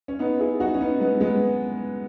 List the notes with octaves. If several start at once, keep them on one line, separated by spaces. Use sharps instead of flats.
C#4
B3 D#4
E4 G#4
D#4 F#4
C#4
B3 D#4
G#3 B3
G#3 B3